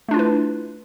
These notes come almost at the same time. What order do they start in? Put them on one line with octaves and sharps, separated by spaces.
A3 D4 F4 E4 B4